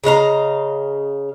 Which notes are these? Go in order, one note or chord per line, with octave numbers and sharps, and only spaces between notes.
C#3 D#5 F5 A#5